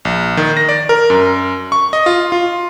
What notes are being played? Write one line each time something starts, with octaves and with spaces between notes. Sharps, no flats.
A#1
D#3
A#6
D5
A#4
F#2
C#6
D#5
F4
F4